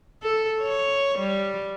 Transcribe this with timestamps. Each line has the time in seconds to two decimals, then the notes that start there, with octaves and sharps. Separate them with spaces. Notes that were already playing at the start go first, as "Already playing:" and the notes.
0.23 A4
0.62 C#5
1.19 G3